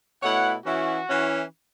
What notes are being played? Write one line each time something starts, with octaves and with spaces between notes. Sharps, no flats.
B2 A3 E4 C#5 F#5
E3 C#4 E4 F#4
E3 C#4 E4